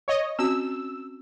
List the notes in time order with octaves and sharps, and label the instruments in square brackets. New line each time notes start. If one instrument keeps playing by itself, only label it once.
[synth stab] C#5 D#5
[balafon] C4 C#4 F#4 [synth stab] E6